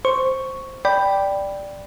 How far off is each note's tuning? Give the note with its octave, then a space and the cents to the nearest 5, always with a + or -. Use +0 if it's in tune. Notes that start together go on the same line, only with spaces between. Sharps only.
C5 +0 C#6 +0
D5 +0 G5 +0 B5 +0